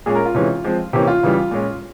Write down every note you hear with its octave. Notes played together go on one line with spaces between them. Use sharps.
A#2 G#3 C#4 G#4
A#4
F4
C3 E3 G#3 C#4
F3 G#3 C4
C3 E3 A#3 C#4 G4
F4
C#3 E3 G3
A#2 G#3 C#4